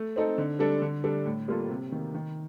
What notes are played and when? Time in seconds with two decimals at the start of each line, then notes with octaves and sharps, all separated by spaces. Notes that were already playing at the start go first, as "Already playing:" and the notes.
Already playing: A3
0.16 C4 D#4 A4
0.38 D3
0.59 G3 D4 A4
0.82 D3
1.04 G3 D4 A4
1.25 A2
1.48 G3 A#3 F4 A4
1.69 C3
1.92 D#3 A#3
2.14 D#3